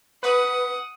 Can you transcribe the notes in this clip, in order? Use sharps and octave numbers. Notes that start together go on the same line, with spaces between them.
B4 F#5 D#6